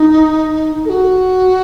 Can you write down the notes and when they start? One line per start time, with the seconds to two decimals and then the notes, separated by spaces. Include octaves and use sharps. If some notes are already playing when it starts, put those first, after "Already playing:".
Already playing: D#4
0.85 A4
0.89 F#4